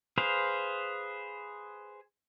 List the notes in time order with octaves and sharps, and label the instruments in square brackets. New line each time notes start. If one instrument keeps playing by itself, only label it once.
[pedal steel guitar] G#4 B4 C5 F5